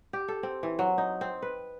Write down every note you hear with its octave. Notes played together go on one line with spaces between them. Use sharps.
G4
A4
C4
E3
F#3
D#4
C4
B4